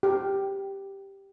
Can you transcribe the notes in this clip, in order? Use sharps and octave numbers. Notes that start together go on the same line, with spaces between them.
G4